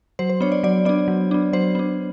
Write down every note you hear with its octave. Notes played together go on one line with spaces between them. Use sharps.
F#3 C5
C5
B3 D4 C#5
D5
F#3 D5
B3 D4 D5
F#3
B3 D4
F#3 C5
B3 D4